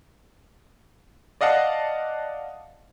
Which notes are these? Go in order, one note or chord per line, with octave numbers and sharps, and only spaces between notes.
D5 D#5 F5 F#5 A5